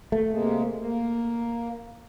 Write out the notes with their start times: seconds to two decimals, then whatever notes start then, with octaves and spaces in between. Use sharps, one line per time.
0.12 A3
0.31 C3 G#3 A#3
0.79 A#3